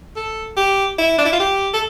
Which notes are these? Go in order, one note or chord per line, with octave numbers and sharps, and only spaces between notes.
A4
G4
E4
D4
E4
F4
G4
A4